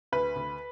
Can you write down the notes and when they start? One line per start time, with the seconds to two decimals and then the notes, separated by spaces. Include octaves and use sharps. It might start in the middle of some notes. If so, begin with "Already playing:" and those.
0.12 D2 B4
0.36 D2